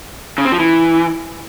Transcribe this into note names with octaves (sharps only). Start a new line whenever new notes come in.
C#3
C4
F3
E3